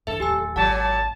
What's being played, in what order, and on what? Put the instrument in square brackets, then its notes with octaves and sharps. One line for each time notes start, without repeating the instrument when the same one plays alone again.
[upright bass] G2 E3 [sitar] A4 [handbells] E5
[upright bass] D1 D#2 [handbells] G4 G#5 E6
[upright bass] G#1 F3 [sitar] A#2 F#3 [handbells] F#5 [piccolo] A5
[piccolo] A5